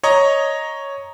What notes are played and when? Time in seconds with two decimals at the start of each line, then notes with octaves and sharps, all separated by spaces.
0.03 C#5 D#5 A#5 C#6